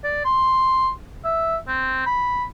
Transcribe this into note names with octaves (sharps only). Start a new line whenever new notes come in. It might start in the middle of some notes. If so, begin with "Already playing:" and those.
D5
C6
E5
C4
B5